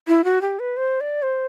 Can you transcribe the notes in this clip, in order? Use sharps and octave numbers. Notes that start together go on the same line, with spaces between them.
E4
F#4
G4
B4
C5
D5
C5